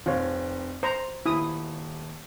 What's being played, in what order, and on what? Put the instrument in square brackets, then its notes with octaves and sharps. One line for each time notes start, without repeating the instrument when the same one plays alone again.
[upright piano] F1 C4 [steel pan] F4 C#5
[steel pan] C5 A#5 [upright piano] C6
[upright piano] D#1 [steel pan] E4 D#6